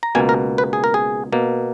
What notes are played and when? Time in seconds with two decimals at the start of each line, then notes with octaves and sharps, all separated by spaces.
0.03 A#5
0.15 C#2 B2 A#3 G#5
0.29 A#4
0.58 B4
0.73 G#4
0.84 A#4
0.94 G#4
1.32 B2 A#3